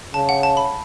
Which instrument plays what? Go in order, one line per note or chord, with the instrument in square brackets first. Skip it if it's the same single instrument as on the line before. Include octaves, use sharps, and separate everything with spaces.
[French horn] C#3 [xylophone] A5
[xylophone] F#5
A5
B5